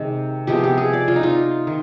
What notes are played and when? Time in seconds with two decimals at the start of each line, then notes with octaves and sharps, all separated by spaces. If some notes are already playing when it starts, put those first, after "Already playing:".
Already playing: C3 D#3 G#3
0.47 C3 F3 G#3 B3 G4
0.63 G4
0.78 G#4
0.93 D5
1.08 F4
1.16 D#4
1.23 F4
1.67 D#3